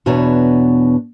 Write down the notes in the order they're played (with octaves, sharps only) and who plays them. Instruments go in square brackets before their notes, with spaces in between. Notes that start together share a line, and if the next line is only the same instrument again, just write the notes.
[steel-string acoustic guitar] E2 B2 D4 B4 C#5 A#5